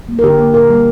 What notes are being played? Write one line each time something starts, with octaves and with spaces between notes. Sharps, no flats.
A#3
A#4
D3 G4
A#3
A#2 A#4
G3 A#3